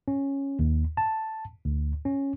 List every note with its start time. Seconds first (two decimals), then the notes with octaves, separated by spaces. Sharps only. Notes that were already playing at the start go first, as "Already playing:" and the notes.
0.08 C#4
0.59 D#2
0.97 A5
1.65 D2
2.05 C#4